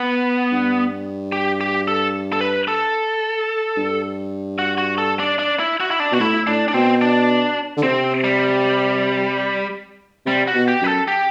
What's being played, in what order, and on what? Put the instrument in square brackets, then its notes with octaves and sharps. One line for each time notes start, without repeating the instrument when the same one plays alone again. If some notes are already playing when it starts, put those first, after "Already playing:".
Already playing: [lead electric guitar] B3
[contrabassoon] G2
[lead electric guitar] G4
G4
A4
A4
B4
A4
[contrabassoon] G2
[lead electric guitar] F#4
F#4
A4
D4
D4
E4
F#4
E4
D4
[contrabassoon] B2 [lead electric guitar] F#4
[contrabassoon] A2 [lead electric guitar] E4
[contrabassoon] A2 [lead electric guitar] D4
[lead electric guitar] D4
[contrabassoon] B2 [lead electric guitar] C4
[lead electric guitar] D4
[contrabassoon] D3
[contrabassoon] C3 [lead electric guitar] C4
[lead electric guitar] G3
[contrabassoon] C3 [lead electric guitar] G3
[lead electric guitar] F#4
[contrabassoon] B2
[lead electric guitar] G4
[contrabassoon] F#2 [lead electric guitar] B4
[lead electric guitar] A4
G4